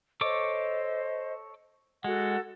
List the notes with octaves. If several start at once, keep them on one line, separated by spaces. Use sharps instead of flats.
A4 C5 C#5 D#5 D6
G#3 F#4 A4 F#5